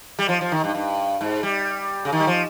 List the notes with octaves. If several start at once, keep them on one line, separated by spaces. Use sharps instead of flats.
G3
F3
F3
D#3
G2
G2
G#2
G3
C#3
D#3
G3
F3